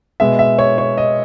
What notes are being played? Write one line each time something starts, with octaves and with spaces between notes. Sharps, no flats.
B2 G#3 B3 E5
E5
C#5
C#5
D#5